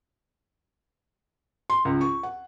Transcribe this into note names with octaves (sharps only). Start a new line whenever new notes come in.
C6
C#2
C#6
F#5